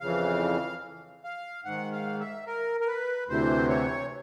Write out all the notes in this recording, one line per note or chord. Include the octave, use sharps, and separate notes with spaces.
F2 C#3 E3 F5
F5
G#2 D#3 F#5
F5
E5
A#4
A#4
B4
D2 C3 E3 C5
C#5